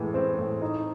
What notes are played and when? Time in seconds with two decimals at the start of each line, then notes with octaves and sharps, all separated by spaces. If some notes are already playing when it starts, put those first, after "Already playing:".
Already playing: A2 E3 G#3
0.14 C4
0.38 A2
0.62 D#4